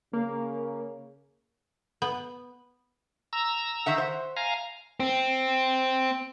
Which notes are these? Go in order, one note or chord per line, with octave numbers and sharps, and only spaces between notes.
C#3 A#3
B3
A#5 E6
D#3 E5 F#5
C5
F5 G#5 A#5
C4